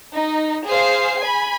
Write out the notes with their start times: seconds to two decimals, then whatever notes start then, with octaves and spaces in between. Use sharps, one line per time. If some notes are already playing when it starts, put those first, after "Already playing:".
0.14 D#4
0.66 G#4 C5 F5 C7
1.20 G#5 B5